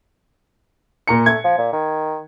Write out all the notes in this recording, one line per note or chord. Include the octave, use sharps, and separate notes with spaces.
A#2 A#5 C#7
A3 G#6
F3
A#2
D#3